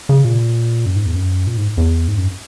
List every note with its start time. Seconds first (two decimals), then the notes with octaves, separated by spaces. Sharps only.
0.09 C#3
0.24 A#2
0.86 F#2
0.96 G#2
1.06 E2
1.16 F#2
1.47 A#2
1.57 G#2
1.77 E2
2.08 G#2
2.17 F#2